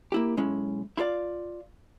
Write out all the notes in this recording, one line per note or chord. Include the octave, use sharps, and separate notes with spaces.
A#3 E4 G4
B1 G#3 C#4 E4
E4 F4 A4 D5 F5